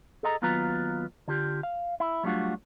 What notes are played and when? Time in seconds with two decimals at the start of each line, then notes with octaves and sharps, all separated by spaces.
0.23 G#4 A4 D#5 A5 A#5
0.42 D#2 F#3 B3 F4 B4 A#5
1.28 D3 F4 G4
1.63 F5
2.00 E4
2.23 F#3 G3 A3 D4 F4 F#4